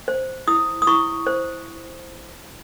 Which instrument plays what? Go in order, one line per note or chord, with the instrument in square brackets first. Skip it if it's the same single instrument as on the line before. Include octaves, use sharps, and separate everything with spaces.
[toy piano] C5
E4 D#6
D#6
E4 C#6
C5